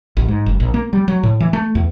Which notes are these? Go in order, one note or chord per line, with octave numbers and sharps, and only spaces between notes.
A1
G#2
F#1
A#1
A#3
G3
F#3
A2
E3
A3
E2